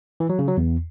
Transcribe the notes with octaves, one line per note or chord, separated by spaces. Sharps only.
E3
F#3
C#3
F#3
E2